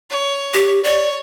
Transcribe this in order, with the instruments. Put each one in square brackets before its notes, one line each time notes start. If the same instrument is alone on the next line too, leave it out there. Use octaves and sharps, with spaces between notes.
[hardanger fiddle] C#5
[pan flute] G4
[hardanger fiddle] C#5 [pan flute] D5